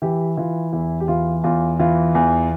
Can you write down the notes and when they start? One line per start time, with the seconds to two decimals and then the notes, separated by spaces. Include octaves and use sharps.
0.02 E3 G4
0.37 E3 F4
0.72 E2 E4
1.00 G4
1.08 E3 F4
1.44 E2 F4
1.80 E3 F4
2.15 E2